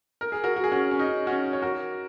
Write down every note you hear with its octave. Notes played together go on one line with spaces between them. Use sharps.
A#4
G#4
F#4 A#4
F#4
G#4
C#4 F#4
C#4
D#4
C#4
C#4 F#4
C#5
F#4 A#4